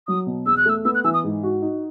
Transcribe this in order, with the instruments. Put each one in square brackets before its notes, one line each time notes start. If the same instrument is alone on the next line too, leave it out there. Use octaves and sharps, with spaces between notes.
[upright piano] F#3 [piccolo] D#6
[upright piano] B2
[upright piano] E2 [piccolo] E6
[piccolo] F#6
[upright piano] A3 [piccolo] E6
[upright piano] B3 [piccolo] E6
[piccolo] F#6
[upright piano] E3 [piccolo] E6
[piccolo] D#6
[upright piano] G#2
F#4
D#4